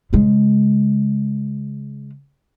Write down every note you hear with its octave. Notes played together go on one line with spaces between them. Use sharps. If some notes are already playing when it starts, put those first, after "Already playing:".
C#3 G#3